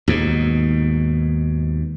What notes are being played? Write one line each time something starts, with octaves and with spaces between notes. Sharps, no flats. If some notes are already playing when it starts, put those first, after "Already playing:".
D#2 G#2 B2